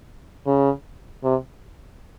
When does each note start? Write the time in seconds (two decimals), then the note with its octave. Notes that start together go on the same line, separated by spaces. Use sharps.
0.46 C#3
1.23 C3